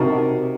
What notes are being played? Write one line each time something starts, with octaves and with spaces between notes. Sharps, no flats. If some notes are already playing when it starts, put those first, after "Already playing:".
Already playing: C3 D#4 F#4 A#4 D#5 A5